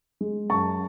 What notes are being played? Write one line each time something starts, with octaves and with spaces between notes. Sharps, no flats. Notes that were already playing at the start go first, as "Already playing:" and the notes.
G#3
F#2 A5 C#6